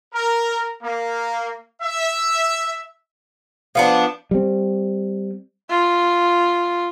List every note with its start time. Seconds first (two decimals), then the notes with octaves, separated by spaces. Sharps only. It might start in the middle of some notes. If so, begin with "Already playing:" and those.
0.13 A#4
0.83 A#3
1.82 E5
3.75 F3 B3 D4 F4 F5
4.31 G3 C4
5.69 F4